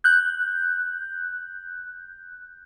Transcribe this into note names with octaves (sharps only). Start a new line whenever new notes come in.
F#6 G6